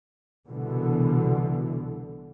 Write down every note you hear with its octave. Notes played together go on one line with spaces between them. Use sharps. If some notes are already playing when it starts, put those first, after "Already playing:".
C2 B2 D3 E3